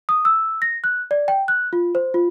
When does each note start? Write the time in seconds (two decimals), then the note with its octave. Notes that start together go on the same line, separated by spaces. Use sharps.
0.09 D#6
0.25 E6
0.62 A#6
0.84 F#6
1.11 D5
1.28 G5
1.48 F#6
1.73 F4
1.95 C5
2.14 F4